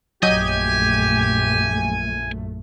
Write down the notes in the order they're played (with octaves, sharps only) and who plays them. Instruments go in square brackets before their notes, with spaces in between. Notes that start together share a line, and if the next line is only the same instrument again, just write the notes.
[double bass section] A#1 F#2 A3 [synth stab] F#3 D#5 G6 [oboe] G4 [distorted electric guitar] G#5